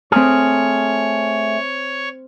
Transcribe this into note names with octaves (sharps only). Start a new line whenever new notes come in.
A3 C4 G#4 C#5 F6